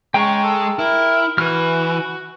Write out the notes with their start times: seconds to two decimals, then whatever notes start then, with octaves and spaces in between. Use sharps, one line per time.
0.14 G#3 C#4 G5 A#5 C#6
0.44 A4
0.79 E4 A#4
1.38 E3 F#4 B4 F6